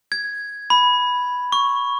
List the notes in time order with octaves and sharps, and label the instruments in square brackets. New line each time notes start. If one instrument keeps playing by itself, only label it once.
[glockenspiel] G#6
B5
C#6